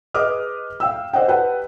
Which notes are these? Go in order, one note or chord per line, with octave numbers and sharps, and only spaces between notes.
G#4 B4 D#5 D6 D#6 F6
F5 G5 E6
A4 C5 D5 D#5 F#5 G5
G4 B4 F#5 G5 A5